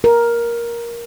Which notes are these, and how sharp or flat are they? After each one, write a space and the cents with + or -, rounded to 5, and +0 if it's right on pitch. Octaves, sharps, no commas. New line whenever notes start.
A#4 +10